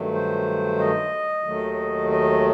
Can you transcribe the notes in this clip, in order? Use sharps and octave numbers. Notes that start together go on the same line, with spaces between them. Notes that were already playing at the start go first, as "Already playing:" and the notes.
Already playing: G2 D#3 F#3 A3
C5
D#5
D#2 D#3 F#3 A3
D#5